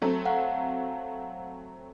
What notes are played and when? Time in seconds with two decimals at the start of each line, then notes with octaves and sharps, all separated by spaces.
0.02 F#3 A3 C4
0.25 F5 F#5